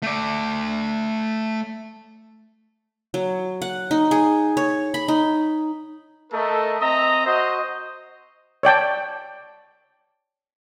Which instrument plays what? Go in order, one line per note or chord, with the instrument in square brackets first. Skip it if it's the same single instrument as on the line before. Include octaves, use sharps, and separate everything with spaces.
[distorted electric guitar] A3 D5
[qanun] F#3
F#5
D#4
G#4
C#5
B5
D#4
[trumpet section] A3 A4 A#4 D#5
C4 D#5 E5 A#5
F#4 C5 D#5
[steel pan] C#5 D5 G5 A5